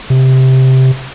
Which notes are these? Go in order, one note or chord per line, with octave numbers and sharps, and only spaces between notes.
C3